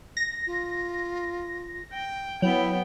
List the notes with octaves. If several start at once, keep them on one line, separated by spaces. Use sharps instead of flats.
A#6
F4
G5
F#3 B3 E4 G5